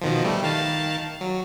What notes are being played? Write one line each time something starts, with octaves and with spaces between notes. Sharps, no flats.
B2 D#3 F3
G3 A3
D#3 F5 A5
F#3